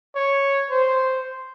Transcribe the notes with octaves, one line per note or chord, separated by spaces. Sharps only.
C#5
C5